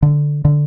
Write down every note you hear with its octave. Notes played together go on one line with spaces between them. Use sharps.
D3
D3